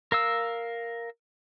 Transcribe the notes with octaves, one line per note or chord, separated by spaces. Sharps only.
A#4 F5 E6